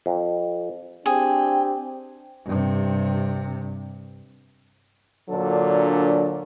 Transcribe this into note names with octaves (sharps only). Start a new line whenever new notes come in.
F2
C4 D4 G4 G#4 G5
G2 C3
A#2 D3 F#3 D4 A4